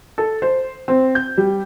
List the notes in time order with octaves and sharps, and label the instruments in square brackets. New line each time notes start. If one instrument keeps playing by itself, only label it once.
[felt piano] A4
C5
C4
G6
G3